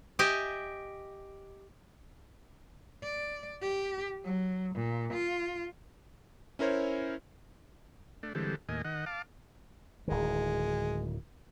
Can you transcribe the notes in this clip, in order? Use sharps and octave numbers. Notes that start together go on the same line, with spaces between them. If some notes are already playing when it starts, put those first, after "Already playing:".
G4 D#5 E5 G#5
D5
G4
F#3
A#2
F4
C#4 E4 A#4 C5 C#5
A3 D4
D3 E3 G3 G#3 C4 A4
D#2 A2 A#3 D#5 G#5
D#3 D#5 F#5
F5 A5 D6
D1 D#3 G#3